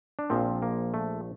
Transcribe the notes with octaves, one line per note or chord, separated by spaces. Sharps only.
D4
A#1 A#2 F3 C4
A#3
A3